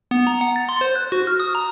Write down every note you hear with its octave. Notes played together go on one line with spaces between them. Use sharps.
B3
A#5
F#5
A6
C6
C5
F#6
F#4
F6
D#6
A#5